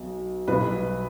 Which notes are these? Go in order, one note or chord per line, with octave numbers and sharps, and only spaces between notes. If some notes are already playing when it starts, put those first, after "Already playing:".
Already playing: B1 B2
B1 B2 G3 B4